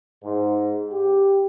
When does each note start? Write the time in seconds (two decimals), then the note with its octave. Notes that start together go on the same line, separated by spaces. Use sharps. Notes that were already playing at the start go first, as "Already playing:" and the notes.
0.23 G#2
0.91 G4